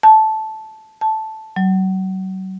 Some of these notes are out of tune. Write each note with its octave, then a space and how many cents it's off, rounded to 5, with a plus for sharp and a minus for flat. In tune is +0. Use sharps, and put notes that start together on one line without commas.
A5 -10
A5 -5
F#3 +35